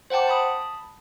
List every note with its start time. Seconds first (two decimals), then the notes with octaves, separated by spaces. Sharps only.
0.10 C5 F#5 G5 A5 D6
0.27 A5 B5 D#6